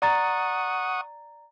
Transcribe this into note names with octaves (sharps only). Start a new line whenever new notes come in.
D5 F#5 A#5 C#6 D#6 A6